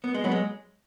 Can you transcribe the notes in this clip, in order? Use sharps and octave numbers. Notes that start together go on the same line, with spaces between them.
B3
G#3
F#3 B3
G#3